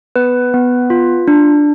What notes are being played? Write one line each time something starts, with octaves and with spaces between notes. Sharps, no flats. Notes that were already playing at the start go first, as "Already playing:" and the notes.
B3 B4
B3
F4
D4